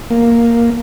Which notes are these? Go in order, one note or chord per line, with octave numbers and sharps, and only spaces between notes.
A#3